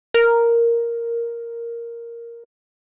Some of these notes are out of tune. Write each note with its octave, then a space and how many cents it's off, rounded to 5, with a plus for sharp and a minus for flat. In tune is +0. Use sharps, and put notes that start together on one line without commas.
A#4 +0